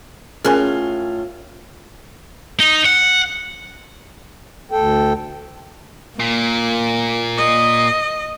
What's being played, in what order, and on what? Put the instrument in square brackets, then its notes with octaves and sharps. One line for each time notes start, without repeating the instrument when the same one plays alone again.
[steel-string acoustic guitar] A2 C#4 F4 [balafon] G#4 A#4 G#5
[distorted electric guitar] D#4
F#5
[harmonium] D2 A4 G5
[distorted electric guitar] A#2 [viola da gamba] A#3
[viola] D#5